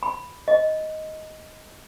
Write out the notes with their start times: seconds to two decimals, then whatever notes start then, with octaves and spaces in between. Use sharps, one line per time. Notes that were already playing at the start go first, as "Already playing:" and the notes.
0.03 B5
0.48 D#5